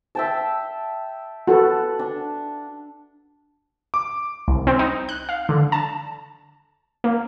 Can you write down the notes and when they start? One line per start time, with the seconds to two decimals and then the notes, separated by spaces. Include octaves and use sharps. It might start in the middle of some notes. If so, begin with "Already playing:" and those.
0.15 E5 G5 A5
1.47 F#4 A4 B4 F#5 A5
1.99 D4
3.94 D6
4.48 C2
4.67 C4
4.79 D#4
5.09 F#6
5.29 F5
5.49 D3
5.72 A5
7.04 A#3